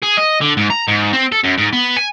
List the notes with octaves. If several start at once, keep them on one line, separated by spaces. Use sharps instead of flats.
G#4
D#5
D3
G#2
A#5
G#2
C4
A4
F#2
G#2
B3
G#5